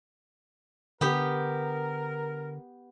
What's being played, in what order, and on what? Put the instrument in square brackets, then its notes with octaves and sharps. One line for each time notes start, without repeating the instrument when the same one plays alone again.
[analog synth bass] D3 [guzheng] B3 G4 [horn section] A#4